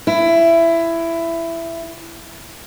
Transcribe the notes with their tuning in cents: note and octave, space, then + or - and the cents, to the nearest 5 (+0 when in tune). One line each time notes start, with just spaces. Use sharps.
E4 +15